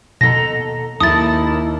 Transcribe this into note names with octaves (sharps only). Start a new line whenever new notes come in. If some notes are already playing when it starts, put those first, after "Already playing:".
D#2 B2 A4 A#5 A#6
D#2 D#4 E4 G#4 A5 D#6 A6